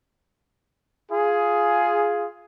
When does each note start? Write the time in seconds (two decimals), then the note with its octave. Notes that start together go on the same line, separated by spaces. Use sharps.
1.12 F4 G#4